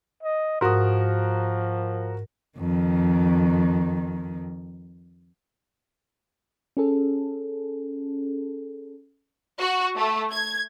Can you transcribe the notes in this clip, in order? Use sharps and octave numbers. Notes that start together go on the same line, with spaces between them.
D#5
G#2 F3 F#4 A#4 D#6
F2 D#3
C#4 G#4 A4
F#4
A3
G#6